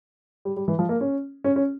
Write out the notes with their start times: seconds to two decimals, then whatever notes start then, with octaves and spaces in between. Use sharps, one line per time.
0.45 G3
0.57 G3
0.68 E3
0.79 F3
0.89 A#3
1.01 C#4
1.44 C#4
1.56 C#4